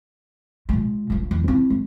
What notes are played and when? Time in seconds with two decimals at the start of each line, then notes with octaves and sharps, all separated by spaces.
0.69 A#2 G#3
1.10 D#1 A#1
1.31 E2
1.48 C4 E4
1.70 G#3